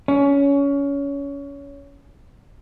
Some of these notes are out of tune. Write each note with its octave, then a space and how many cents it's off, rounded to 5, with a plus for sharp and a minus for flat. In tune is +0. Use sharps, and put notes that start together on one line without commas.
C#4 +20